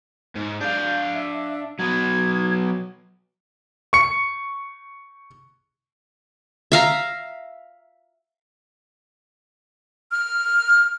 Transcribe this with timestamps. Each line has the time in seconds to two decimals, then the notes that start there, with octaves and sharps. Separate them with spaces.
0.35 G#2
0.60 D4 F5 G6
1.14 E5
1.79 F#3 B3 G#6
3.93 C#6 C#7
6.72 E5 F5 A#5
10.12 F6